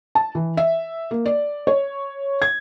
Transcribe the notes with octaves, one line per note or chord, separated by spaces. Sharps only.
A5
E3
E5
A#3
D5
C#5
G#6